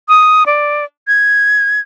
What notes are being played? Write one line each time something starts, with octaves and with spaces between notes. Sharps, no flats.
D#6
D5
G#6